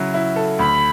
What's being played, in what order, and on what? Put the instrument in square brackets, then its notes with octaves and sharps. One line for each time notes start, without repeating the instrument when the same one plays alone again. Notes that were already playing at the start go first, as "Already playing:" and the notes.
Already playing: [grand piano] C#3 F#3 E4
E4
A4
[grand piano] D2 [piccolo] B5